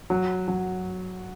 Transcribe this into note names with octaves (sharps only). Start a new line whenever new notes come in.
F#3
F#3